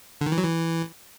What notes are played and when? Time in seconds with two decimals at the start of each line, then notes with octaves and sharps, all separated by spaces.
0.21 D3
0.27 D#3
0.32 E3
0.38 F#3
0.43 E3